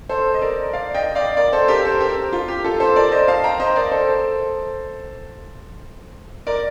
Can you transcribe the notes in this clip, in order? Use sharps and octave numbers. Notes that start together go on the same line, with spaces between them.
A4 C5
D#5
A#4 D5
D5 F5
D#5 G5
D5 F5
A#4 D5
A4 C5
G4 A#4
A4 C5
G4 A#4
F4
G4
F4 A4
A4 C5
A#4 D5
C5 D#5
F5 A5
G5 A#5
C5 D#5
A#4 D5
A4 C5
A#4 D5